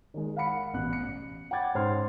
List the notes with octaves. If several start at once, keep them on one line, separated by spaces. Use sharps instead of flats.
D#3 G#3
F5 F#5 B5 C#7
A1 B2 F#6
C#7
F#5 G5 B5 D6 G#6 A6
G#2 C#4 C5 C6 F6